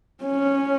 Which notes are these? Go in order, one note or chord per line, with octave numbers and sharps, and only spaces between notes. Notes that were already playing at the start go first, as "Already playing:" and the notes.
C#4